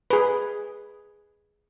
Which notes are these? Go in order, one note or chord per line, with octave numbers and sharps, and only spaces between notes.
G#4 B4